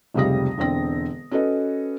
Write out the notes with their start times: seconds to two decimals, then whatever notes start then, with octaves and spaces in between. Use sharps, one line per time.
0.14 F1 C#2 C3 G3 D#6 A#6
0.58 E1 D3 C4 A#6
1.31 C#4 F#4 A4 B4 D#5